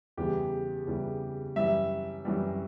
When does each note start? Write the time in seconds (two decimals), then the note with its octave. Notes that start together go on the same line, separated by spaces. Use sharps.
0.17 E2 C#3 E3 G3 G4
0.86 E2 C#3 E3 G3
1.56 F#2 E3 G3 E5
2.25 F#2 E3 G3